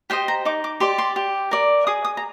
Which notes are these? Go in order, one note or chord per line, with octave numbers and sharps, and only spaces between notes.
G4 C5 D#5 G5
A#5
D#4 D6
D6
G4 D5 C6
C6
G4
A#4 D5
G#4 D#6
D#6
A#5